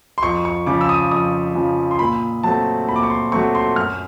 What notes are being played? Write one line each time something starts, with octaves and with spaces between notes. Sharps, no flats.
C6
F2 C#6
C#6
C#3 F3 D6
E6
D#6
F2 D#6
C#3 F3
C6
A#2 B5
F#3 A3 C4 A5
A#2 B5
D6
C#6
C6
F#3 A3 C4 C#6
C6
F#2 F6